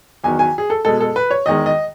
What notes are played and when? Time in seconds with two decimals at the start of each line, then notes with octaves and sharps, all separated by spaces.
0.24 E2 D#3 F#3 G#5
0.39 G#5
0.58 G#4
0.70 A4
0.85 B2 G#3 A4
1.00 A4
1.16 B4
1.31 C#5
1.46 E2 D#3 G#3 D#5
1.66 D#5